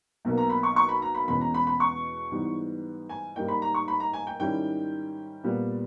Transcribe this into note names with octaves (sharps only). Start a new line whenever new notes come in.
B1 B2 A#3
A#5
B5
C#6
C#6
B5
A#5
B5
E2 B2 G#3 C#4 B5
A#5
B5
B5
C#6
G#2 E3 G3 B3
G#5
G#2 G3 A#3 D#4 G5
B5
A#5
C#6
B5
A#5
G#5
G5
G#2 D#3 G3 C#4 E4 G5
A#2 G3 B3